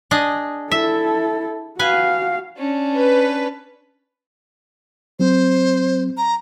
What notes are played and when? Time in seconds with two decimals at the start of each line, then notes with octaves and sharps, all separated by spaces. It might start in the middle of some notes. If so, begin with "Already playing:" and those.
0.11 D4 G#4 D#5
0.72 E4 A4 E5
1.79 F#4 B4 F5 G#5
2.57 C#4 D4
2.95 B4
5.20 F#3 C4 C5
6.17 A#5